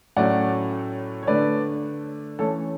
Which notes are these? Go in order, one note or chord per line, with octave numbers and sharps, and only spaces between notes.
A2 F#3 A3 C#4 D5 F#5
C#5
D3 A3 D4 B4 D5
E3 A3 C#4 A4 C#5